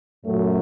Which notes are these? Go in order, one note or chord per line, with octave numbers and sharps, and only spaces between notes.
F#2 A#2 F#3 A3